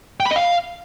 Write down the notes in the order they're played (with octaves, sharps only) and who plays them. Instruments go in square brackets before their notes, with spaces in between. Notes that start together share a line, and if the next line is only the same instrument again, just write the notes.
[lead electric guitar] G5
B5
D#5
F5